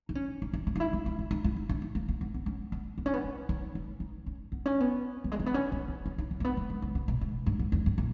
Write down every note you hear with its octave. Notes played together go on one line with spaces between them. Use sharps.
D#4
C#4
D#4
D#4
E4
D#4
E4
D#4
C#4
C#4
D#4
E4
D#4
C#4
D#4
A#3
A#3
B3
B3
C#4
B3
B3
C#4
B3
C#4
D#4
D#4
D#4
C#4
B3
C#4
B3
G3
G#3
A#3
B3
C#4
E4
D#4
E4
D#4
C#4
A#3
B3
A#3
G#3
C#3
C#3
B2
G#2
G2
G#2
E2
G2
A#2